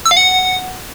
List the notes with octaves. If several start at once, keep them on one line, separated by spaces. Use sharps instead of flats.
E6
F5
F#5